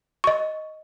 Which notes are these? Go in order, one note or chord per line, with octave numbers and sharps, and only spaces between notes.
D#5 C#6